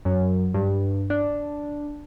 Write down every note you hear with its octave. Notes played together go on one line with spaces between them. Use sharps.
F#2
G2
D4